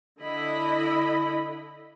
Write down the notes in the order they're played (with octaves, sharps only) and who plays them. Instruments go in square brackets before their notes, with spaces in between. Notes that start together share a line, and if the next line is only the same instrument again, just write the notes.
[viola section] D3 E4 D#5 B5